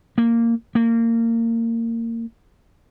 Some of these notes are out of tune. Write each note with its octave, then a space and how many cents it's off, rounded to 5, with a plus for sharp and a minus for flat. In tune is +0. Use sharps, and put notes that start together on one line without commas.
A#3 -10
A#3 -25